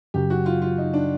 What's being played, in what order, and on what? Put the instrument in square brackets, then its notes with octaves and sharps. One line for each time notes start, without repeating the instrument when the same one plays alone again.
[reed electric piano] F#2 C#3 F#3 [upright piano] G4
[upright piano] F#4
F4
F4
D#4
D4